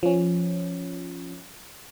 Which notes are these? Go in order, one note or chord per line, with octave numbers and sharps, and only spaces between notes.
F3 C#4